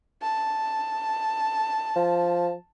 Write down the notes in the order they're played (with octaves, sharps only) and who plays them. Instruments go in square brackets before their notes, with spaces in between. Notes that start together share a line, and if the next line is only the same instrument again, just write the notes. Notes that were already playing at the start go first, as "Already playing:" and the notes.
[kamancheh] A5
[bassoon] F3